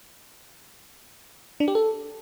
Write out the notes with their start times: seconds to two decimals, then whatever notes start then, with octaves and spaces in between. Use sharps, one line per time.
1.60 D4
1.68 G4
1.75 A4